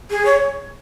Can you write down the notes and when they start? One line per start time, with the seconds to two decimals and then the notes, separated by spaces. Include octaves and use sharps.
0.10 G#4
0.25 C#5